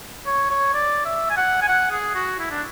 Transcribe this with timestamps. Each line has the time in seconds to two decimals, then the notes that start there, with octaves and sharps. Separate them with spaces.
0.26 C#5
0.50 C#5
0.74 D5
1.05 E5
1.30 G#5
1.37 F#5
1.62 G#5
1.68 F#5
1.91 G#4
2.15 F#4
2.39 E4
2.51 D4